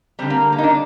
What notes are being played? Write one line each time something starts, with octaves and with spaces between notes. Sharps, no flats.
D3 G3 C4
A#3
A#3
D#4
D4